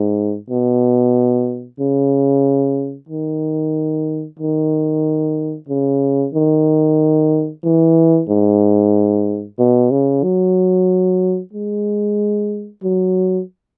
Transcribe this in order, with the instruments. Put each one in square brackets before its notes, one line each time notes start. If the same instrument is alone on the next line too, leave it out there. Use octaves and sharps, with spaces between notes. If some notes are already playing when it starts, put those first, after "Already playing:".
Already playing: [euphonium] G#2
B2
C#3
D#3
D#3
C#3
D#3
E3
G#2
B2
C#3
F#3
G#3
F#3